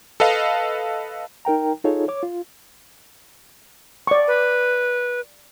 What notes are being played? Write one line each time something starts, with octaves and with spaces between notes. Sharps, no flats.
A4 B4 D#5 F5
D#4 A#4 G5 A#5
D#4 F4 G#4 A4 C#5
C#5 D6
F4
D5 C#6
B4